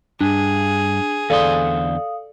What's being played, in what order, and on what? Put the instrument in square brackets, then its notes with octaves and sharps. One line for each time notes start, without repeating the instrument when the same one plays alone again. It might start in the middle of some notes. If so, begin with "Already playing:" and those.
[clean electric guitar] G2 [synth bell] D4 [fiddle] G#4
[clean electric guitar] E2 D3 C5 [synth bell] A4 D5 [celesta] F5 D#6